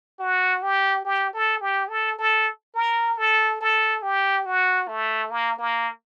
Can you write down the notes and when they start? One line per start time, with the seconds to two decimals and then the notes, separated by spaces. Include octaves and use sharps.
0.19 F#4
0.62 G4
1.05 G4
1.33 A4
1.61 G4
1.89 A4
2.18 A4
2.75 A#4
3.18 A4
3.61 A4
4.02 G4
4.46 F#4
4.88 A3
5.31 A#3
5.58 A#3